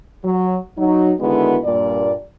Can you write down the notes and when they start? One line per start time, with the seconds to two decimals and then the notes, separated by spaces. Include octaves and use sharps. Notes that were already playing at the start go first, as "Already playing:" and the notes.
0.24 F#3
0.78 F#3 D#4
1.19 D3 D#3 G#3 B3 E4 F#4
1.64 G2 A#2 D5